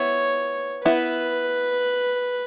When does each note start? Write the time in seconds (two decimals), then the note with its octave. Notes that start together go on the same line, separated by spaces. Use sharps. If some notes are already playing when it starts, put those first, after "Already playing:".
Already playing: B3 E4 C#5
0.85 B3 E4 B4